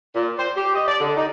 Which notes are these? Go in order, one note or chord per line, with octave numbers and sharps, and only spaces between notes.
A#2
C5
G4
D#5
D5
D3
D#4